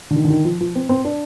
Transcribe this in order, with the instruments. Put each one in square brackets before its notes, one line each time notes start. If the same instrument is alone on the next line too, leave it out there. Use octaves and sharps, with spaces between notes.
[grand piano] D3
D#3
D3
D#3
F3
F3
C4
C4
D4